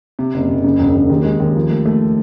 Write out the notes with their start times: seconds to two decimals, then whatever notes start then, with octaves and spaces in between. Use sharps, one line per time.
0.19 C3
0.34 F#1
0.49 F#1
0.64 C#3
0.79 E1
0.94 E1
1.09 D#2
1.25 G#3
1.40 D#2
1.56 F3
1.70 A3
1.85 A3